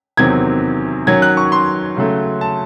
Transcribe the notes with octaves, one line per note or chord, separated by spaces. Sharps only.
E2 C3 D#3 F#3 C4 G#6
D#3 F#3 C#4 G#6
F#6
C#6
C6
C#3 F#3 A3
A5